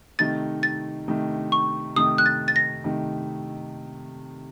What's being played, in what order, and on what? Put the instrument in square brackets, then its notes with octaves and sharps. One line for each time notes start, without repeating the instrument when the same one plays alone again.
[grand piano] C3 D#3 A3 D#4 [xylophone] A6
[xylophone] A6
[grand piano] C3 D#3 A3 D#4
[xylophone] C#6
[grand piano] C3 D#3 A3 D#4 [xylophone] D#6
[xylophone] F#6
A6
A6
A#6
[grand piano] C3 D#3 A3 D#4